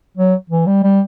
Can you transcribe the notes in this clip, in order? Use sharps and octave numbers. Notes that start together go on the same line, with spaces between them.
F#3
E3
G3
G3